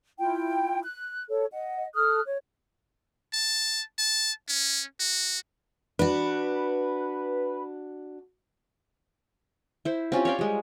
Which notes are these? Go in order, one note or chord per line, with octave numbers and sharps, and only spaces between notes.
E4 F4 G5
F#6
A4 C#5
D#5 F#5
A4 D#6 F6 F#6
C#5
A5
A5
C#4
F#4
D4 F#4 B4
E4 C5
C4 C#4 F4 G4
C#5 D5 F5 G5
G3 G#3